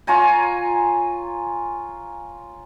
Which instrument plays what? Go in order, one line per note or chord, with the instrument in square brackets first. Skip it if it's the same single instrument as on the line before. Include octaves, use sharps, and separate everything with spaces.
[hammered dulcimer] F4 C#5 G#5 A#5